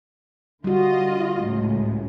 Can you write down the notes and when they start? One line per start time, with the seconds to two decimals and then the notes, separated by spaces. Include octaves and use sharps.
0.64 D3 G3 F4 F#4 D#5
1.38 C#2 A2